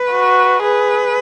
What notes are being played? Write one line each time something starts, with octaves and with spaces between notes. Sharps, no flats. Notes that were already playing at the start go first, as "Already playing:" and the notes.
Already playing: B4
F#4
G#4 B4